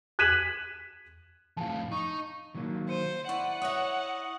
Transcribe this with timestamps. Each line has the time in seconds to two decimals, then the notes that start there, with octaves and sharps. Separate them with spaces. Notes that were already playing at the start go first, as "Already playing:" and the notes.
0.19 F#6 G#6 B6 D#7 E7 F#7
1.57 F2 A2 F5 A5
1.92 D#4 C#6
2.54 D#3 F#3 A#3
2.89 C5 C#7 D#7
3.29 E4 D5 F#5 C#6
3.62 C#5 E5 D#6 F#6 A#6